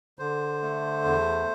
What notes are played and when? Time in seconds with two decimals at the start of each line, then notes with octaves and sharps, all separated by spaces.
0.19 D3 C5
0.62 A3
1.05 E2